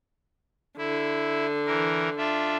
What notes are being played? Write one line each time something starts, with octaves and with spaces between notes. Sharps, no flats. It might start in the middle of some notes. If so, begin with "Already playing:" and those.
D3 E4
E3 A#4
D4 F4 E5